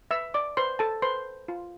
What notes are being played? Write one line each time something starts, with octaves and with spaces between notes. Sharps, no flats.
B4 E5 E6
D5 D6
B4 C5 C6
A4 A5
B4 C5 C6
F4